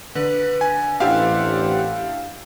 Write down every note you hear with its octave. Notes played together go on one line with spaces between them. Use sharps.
D3 B4
G#5
A1 C4 D4 E4 G4 F5 F#5